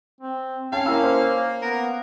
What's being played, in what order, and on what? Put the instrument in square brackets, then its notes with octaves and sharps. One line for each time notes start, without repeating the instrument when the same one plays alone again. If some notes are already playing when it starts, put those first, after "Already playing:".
[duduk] C4
[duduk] C#4 [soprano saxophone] F5 [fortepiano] G5 A5
[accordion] A#3 [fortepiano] E4 A#5 E6
[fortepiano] C5
[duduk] B3 [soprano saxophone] A#4